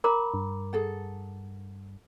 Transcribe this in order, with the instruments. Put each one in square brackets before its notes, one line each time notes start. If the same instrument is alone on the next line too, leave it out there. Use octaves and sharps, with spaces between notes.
[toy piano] A#4 A#5 D6 [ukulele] B5
[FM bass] G2
[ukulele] G#4 A4 F#5